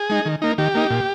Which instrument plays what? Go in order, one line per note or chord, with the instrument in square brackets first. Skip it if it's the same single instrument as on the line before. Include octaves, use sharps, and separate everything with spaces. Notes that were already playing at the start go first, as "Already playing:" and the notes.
Already playing: [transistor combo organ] G#4
G#3 D#4
D#3
A#3 D#4
D#3 G4
A#3 D#4
A#2